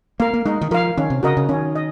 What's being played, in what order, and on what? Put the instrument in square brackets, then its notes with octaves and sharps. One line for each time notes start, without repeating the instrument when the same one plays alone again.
[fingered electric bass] A#3 [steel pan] A#4 F5
[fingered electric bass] A#3
[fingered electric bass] G#3 [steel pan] D#4
[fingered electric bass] D#3
[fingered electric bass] F3 [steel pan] A#4 F5
[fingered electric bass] D#3 [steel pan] C#4
[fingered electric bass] C3
[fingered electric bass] C#3 [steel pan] F#4 A#4 D#5
[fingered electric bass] C#3
[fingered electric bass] D#3 [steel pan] C#4
[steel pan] D#5